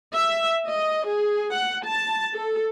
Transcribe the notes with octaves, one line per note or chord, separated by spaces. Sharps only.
E5
D#5
G#4
F#5
A5
A4